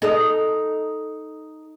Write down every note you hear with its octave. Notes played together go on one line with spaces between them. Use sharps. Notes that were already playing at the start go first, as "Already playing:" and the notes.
D#4 A4 D#5